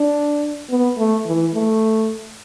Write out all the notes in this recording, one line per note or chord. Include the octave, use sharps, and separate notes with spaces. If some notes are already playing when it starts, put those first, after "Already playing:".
Already playing: D4
B3
A3
E3
A3